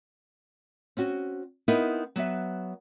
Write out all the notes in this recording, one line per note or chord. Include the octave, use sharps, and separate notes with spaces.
C4 C#4 F#4
B3 C4 D#4 E4 A#4 B4
F#3 B3 B4 E5